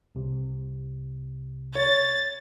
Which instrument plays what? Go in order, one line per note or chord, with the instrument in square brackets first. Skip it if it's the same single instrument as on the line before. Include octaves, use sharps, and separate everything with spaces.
[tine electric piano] C2 C3
[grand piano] C#5 [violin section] A6